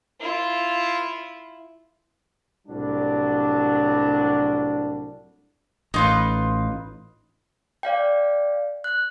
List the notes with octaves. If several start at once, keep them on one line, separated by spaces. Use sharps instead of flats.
E4 F4
C2 A2 F#3 G3 D4
A1 D#4 F4 B4
D5 F5 G5
F#6